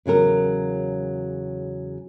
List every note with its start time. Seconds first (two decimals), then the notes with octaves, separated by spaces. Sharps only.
0.06 E2 C#3 F#3 A#4